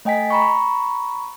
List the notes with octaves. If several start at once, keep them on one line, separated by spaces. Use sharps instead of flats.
A3 D#5 G5 G#5 B6
A#5 B5 C#6